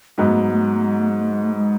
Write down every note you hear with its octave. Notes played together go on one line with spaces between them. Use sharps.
G#2 F#3 G#3 B3
A3
G#3
A3
G#3
A3
G#3
A3
G#3
A3
G#3
A3
G#3